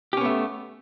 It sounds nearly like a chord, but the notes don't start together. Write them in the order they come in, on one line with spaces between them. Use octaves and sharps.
G4 C#4 B3 A3